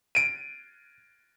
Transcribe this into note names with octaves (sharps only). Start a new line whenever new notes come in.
D7 D#7